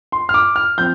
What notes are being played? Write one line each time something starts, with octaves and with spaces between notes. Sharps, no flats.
C6
F6
D6
F6
F3 C4 G6